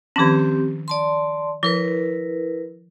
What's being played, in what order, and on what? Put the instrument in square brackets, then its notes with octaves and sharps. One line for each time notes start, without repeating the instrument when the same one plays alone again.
[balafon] D#3 F3 C#4 [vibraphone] C4 G4
[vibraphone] D5 A5 C6
[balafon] F3 [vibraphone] E4 A#4 B4